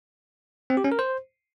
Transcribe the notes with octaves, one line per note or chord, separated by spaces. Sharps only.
C4
G4
C#4
A#4
C5